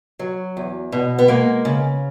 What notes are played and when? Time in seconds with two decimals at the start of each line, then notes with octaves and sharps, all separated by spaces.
0.19 F#3
0.57 E2
0.92 B2
1.19 B3
1.28 G#3 A#3
1.65 C#3